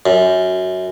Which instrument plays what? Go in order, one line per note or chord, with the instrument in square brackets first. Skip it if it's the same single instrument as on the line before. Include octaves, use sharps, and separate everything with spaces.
[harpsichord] F#2